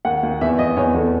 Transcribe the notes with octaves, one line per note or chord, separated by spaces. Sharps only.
D#2 F#5
D#2
E2 E5
E2 D#5
E2 C#5
E2 A4